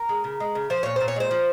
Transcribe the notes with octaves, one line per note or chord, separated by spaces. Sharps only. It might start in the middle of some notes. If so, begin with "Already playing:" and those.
Already playing: A#4
G#3
C#3
G#3
C#3
F3 C5
A#2 C#5
A#2 C5
C#5
G#3 C5
F3